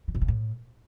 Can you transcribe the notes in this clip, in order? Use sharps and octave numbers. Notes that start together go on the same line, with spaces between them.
D#3
C3
C#3
A2